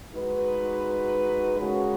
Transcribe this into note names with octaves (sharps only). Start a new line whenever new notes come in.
G#3 D#4 F#4 B4
C#3 G#3 C#4 F#4 A#4